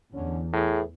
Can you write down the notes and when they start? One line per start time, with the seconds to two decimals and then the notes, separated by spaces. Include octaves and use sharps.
0.14 E2 D3 C#4
0.53 A2 E3 G#4